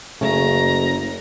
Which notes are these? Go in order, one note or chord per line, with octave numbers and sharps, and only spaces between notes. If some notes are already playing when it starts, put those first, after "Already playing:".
F#1 C#3 A3 C#4 A#5